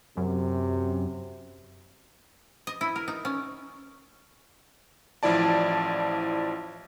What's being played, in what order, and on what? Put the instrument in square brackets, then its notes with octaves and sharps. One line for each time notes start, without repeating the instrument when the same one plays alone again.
[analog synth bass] F#2 [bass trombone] C3
[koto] D#5
E4
A#4
D#4
C#4
[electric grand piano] A1 F3 E4 D5 A5